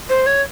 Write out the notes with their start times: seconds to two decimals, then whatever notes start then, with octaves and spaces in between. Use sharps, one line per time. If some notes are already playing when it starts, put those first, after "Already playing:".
0.10 C5
0.26 C#5